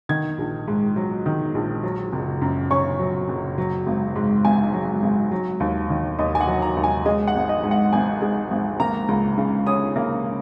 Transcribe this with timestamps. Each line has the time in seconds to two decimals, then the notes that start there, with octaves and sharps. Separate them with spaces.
0.09 D#3 G#6
0.38 A#1
0.68 G#2
0.96 F#3
1.26 D#3
1.55 A#1
1.83 F#3
2.13 F#1
2.41 F#2
2.71 C#4 C#6
2.99 F#3
3.29 F#1
3.58 F#3
3.86 G#1
4.16 G#2
4.45 G#1 G#5
4.73 F#3
5.03 G#1
5.31 F#3
5.60 D#2
5.89 D#3
6.19 D#2 D#5
6.35 G#5
6.41 F#5
6.47 F#3
6.62 A#5
6.77 D#2
6.84 G#5
7.05 G#3 D#5
7.27 F#5
7.35 G#1
7.49 D#5
7.63 G#2
7.71 F#5
7.93 G#1 G#5
8.21 G#3
8.51 G#1
8.80 A#3 A#5
9.08 C#2
9.38 C#3
9.67 C#4 D#6
9.96 A#3